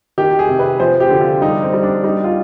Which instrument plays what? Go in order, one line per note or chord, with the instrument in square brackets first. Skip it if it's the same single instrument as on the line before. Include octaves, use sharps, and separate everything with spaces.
[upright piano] D#3 G4
G#4
C3
B4
F3 C5
G4
D3
F4
G3 D#4
C4
G3
D4
G3 D#4
F4